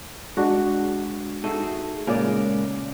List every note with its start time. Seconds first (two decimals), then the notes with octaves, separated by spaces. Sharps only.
0.37 G#3 D4 F#4
1.44 A3 D#4 F#4 G#4
2.07 A#2 C#3 G#3 A#4 D5